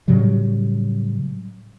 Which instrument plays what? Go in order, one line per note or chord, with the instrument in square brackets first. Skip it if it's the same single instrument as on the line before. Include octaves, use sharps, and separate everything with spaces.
[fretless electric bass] A2 C#3 F#3 G3